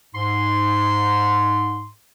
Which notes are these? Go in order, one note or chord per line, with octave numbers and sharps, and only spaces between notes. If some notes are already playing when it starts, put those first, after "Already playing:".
G#2 C6